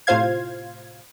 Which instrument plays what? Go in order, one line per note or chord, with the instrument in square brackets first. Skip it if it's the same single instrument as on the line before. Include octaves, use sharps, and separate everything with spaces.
[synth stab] A2 C3 F4 C5 F5 G#6